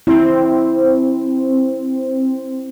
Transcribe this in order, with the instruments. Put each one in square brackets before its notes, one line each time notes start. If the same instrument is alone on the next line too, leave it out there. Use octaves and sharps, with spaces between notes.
[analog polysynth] C4 [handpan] E4